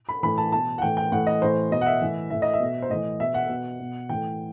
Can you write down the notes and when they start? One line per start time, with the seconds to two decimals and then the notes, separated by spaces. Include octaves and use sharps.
0.09 B5
0.23 A2 E3 B5
0.38 A5
0.52 B2 A5
0.78 F#5
0.82 A2 E3 G5
0.97 G5
1.12 A2 E3 F#5
1.27 D#5
1.41 A2 E3 C5
1.71 B2 D#5
1.81 F#5
1.86 E5
2.02 A2 E3
2.30 A2 E3 E5
2.42 D#5
2.54 E5
2.60 B2
2.82 C5
2.90 A2 E3 D#5
3.19 B2 E5
3.34 F#5
3.49 B2
3.80 B2
4.09 A2 E3 G5